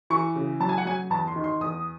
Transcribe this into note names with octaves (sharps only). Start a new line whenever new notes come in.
E3 C#6
C#3
F#3 A5
G#5
F#5
F#3 G#5
E2 A5
C6
D#3
C6
E2 D#6